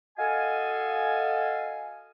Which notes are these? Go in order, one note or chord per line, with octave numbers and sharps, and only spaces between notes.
F#4 A4 D#5 F5 G#5